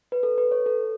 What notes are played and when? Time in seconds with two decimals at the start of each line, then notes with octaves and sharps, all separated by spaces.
0.12 B4
0.23 A4
0.38 B4
0.51 C#5
0.66 A4